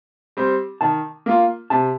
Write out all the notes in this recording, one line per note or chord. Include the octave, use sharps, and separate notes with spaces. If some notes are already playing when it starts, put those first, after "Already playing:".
G3 C4
D#3 A5
A#3 F4
C3 A5